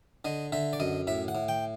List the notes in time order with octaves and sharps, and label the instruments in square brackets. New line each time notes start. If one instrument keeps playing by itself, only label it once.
[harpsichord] D3 D#5
D3 E5
D5
F#2 D#5
A2 E5
F#5
A2
G5